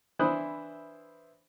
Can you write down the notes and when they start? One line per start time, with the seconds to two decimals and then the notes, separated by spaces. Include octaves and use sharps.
0.19 E3 D4 E4 C5 D#6 F#6